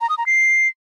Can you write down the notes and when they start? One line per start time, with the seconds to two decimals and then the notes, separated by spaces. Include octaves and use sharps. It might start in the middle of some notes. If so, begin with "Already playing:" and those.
0.01 A#5
0.09 D#6
0.18 A#5
0.26 C7